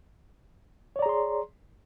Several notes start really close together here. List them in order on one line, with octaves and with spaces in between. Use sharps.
C#5 D5 A#5 G#4 C6